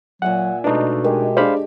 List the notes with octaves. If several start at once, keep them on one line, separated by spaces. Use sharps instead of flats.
A#2 F#3 E5 F#5 G#5
B2 G#3 A3 D4 D#4 B4
G#3 G4 G#4 A#4
D4 G4 G#4 C5 D5 F5 B5